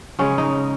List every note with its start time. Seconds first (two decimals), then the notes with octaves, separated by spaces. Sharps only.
0.19 C#3 G#3 C#4
0.38 D#4